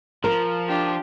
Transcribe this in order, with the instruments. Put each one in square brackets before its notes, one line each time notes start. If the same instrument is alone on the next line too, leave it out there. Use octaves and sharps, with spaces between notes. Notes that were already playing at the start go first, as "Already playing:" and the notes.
[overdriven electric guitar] F3 [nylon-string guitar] A#4
[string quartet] D4 F4 G4